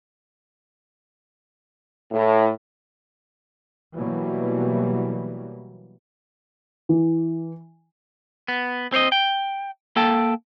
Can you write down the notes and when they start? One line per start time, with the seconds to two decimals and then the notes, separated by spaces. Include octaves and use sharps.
2.12 A2
3.96 B2 E3 F#3 G3 A#3
6.89 E3
8.48 B3
8.92 C4 C5 C#5 D#5
9.12 G5
9.96 A#3 A4 G5 A5